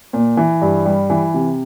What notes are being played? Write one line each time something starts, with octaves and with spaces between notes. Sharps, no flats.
A#2
E3
G2
G3
E3
C3